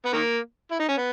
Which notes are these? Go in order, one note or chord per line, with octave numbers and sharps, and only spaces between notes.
B3
D#3 A#3
E4
D#4
C#4
B3